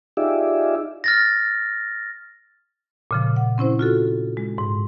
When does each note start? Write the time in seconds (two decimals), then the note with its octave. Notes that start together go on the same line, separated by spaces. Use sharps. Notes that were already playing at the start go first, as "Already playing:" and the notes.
0.17 D#4 F4 G4 G#4 D5 E5
1.04 F6 A6 A#6
3.11 A#2 C#3 F3
3.36 F#5
3.58 C4 C#4 E4 C5
3.79 F4 F#4 A4
4.37 G#3
4.58 G#2